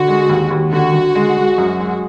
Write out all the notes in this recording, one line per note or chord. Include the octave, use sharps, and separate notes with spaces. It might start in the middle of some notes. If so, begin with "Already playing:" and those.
Already playing: D3 F#4
G#3
D#2
D#2
D3 F#4
D3
G#3
G#3
F#2
G#3